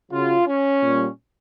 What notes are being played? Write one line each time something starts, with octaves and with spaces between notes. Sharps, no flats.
C#3 F#3 F4
C#4
A#2 G3